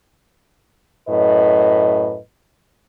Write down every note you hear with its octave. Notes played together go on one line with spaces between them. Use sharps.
F#2 A2 B4 D#5